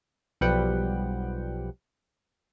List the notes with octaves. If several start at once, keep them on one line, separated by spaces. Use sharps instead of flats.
B1 F3 G3 B4 F#5 G5